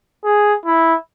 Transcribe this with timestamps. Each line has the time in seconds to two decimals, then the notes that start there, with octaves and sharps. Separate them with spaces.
0.25 G#4
0.66 E4